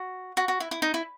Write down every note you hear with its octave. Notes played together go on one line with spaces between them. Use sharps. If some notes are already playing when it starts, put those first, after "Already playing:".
Already playing: F#4
F#4
F#4
E4
E4
D#4
E4